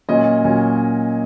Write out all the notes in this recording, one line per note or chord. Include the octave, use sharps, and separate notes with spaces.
A#2 F#3 C#4 D#5
A#2 F#3 C#4